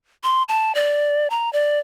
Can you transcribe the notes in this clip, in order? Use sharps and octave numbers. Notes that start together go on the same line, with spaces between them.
C6
A5
D5
A#5
D5